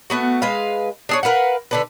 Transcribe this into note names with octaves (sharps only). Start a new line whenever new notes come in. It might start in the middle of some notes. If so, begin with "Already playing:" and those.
A3 B3 F#4
G#3 B4 F5
D4 G#4 C#5
A#4 B4 F5 F#5
D3 D4 B4